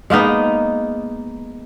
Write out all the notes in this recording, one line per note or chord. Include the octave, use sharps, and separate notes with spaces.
G#3 A#3 B3 D#4